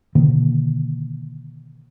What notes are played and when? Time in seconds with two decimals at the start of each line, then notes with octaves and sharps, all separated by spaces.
0.15 B2 D3 D#3 A#3